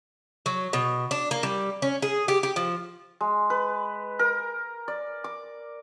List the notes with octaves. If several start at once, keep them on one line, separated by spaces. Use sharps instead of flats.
F#3
B2
D4
A#3
G3
C#4
G#4
G4
G4
F3
G#3
B4
A#4
D5
D6